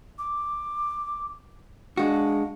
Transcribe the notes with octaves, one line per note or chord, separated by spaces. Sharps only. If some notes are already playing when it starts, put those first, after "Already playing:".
D6
G#3 D4 F#4 F5